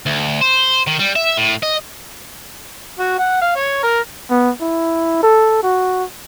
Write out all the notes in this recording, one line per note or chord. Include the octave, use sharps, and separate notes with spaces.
D2
C5
D#3
G3
E5
A2
D#5
F#4
F#5
F5
C#5
A#4
B3
E4
A4
F#4